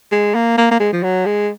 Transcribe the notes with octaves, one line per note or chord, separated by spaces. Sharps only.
G#3
A#3
A#3
A#3
G#3
F3
F#3
G#3